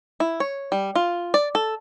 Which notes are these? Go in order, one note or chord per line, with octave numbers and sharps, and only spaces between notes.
E4
C#5
G3
F4
D5
A4